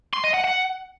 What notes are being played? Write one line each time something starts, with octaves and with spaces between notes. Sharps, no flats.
C6
D#5
F#5
F#5